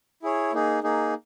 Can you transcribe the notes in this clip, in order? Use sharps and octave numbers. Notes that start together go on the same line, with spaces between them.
E4 G#4 C#5
A#3 D#4 G#4
A#3 D#4 G#4